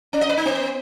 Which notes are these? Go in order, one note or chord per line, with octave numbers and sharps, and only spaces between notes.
C#4
D#5
B4
D#4
B3